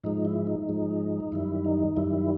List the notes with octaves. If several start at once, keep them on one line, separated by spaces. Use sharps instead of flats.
G#2 F3 G#3 D#4
E4
D#4
G#2 F3 G#3
F#2 D#3 G3 E4
D#4
F#2 D#3 G3 E4